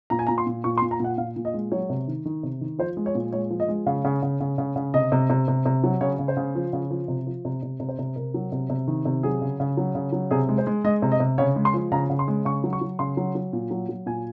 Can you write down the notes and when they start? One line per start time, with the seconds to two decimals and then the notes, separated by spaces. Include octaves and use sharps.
0.10 A#2 A#5
0.19 G#5
0.27 A#2 A#5
0.38 C6
0.47 A#2
0.64 A#2 C#6
0.78 C6
0.82 A#2
0.91 A#5
1.00 A#2 F#5
1.18 A#2 F5
1.36 A#2
1.45 D#5
1.54 G#3
1.72 F#3 C#5
1.90 C3
2.08 D#3
2.25 D#3
2.43 C3
2.61 D#3
2.79 F3 C5
2.97 G#3
3.06 C#5
3.15 A#2
3.32 G#3 C#5
3.50 F3
3.60 D#5
3.68 G#3
3.86 C#3 F5
4.04 C#3
4.22 C#3
4.40 C#3
4.58 C#3
4.76 C#3
4.94 C3 D#5
5.12 C3
5.30 C3
5.48 C3
5.66 C3
5.84 F#3
6.01 C#3 C#5
6.19 C#3
6.28 C5
6.37 C#3
6.55 F3
6.73 C#3
6.91 F3
7.08 C3
7.27 F3
7.45 C3
7.63 C3
7.80 C3
7.89 C5
7.99 C3
8.16 C3 A#4
8.34 F#3
8.52 C3
8.70 C3
8.88 D#3
9.05 C3
9.23 F#3 G#4
9.42 C#3
9.60 C#3
9.77 F#3
9.95 C#3
10.12 F#3
10.31 C3 G#4
10.49 G#3
10.58 C5
10.67 G#3
10.84 G#3 D#5
11.02 C3
11.12 D#5
11.20 C3
11.38 C#3 C#5
11.56 G#3
11.65 C6
11.74 F3
11.92 C#3 A#5
12.10 C#3
12.19 C6
12.28 G#3
12.45 C#3 C#6
12.64 F#3
12.73 C#6
12.81 F#3
12.99 C#3 C6
13.17 F#3
13.35 F#3
13.53 A#2
13.71 F#3
13.89 F#3
14.06 A#2 G#5